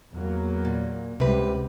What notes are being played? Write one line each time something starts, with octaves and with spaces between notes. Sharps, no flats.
E2 F#3 A#3
A#2
C#2 C3 G3 G4 B4